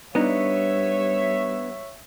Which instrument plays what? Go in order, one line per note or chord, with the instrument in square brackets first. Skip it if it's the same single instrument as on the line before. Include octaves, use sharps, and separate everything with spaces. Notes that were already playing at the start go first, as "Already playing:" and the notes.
[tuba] G3 [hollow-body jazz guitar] B3 D4 D#4 [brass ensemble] C#5 E5